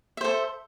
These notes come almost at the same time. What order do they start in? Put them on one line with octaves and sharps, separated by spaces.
E5 C5 A4